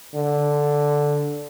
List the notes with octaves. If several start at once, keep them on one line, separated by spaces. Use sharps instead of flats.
D3